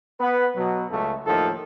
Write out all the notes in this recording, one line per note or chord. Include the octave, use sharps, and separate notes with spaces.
B3 B4
B2 F#3
C#2 C#3 A3
D#2 A2 D#3 F3 A4